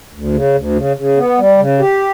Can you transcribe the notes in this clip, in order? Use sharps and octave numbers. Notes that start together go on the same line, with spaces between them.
D2
C#3
D2
C#3
C#3
B3
G3
C#3
G4